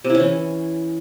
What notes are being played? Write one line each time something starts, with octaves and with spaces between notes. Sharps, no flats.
C3
E4
C#4
E3